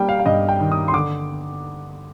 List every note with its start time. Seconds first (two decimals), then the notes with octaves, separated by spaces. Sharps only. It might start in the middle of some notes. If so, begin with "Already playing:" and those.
Already playing: G3 A#3 G5
0.09 F5
0.20 F5
0.26 G2 D#5
0.49 G5
0.60 D#3
0.72 D#6
0.88 C6
0.93 D3 D6